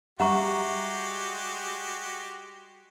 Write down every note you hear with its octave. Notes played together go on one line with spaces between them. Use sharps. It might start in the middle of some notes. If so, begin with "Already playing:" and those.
G3 G#3 F#4 G4 E5 F#5 A#5 C#6